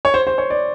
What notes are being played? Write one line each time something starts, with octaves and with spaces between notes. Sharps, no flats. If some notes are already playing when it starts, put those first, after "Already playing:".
C#5
C5
C5
C#5
D5